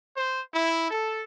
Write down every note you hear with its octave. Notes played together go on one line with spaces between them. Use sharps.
C5
E4
A4